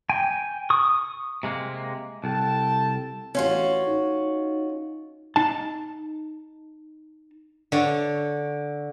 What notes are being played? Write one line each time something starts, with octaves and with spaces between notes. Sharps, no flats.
G5 G#5
C#6 D#6
C3 G#3 A#3
C2 A4 G5 A5
A1 C#4 F4 F#4
D#4
D#4 A5
D3 C#5